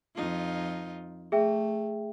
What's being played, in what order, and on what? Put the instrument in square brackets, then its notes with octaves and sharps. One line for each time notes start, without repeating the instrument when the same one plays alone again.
[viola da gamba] F2 D#4 F4
[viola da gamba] A3 [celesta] G#4 E5 G5